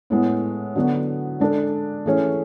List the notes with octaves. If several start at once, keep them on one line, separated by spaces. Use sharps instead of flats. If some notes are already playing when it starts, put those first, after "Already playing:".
A2 G#3 B3
D3 F#3 B3 F#4
G#3 D4 A4
E3 A3 C#4 G#4 C#5